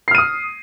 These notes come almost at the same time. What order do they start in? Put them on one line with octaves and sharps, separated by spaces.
C7 F6 D#7 D#6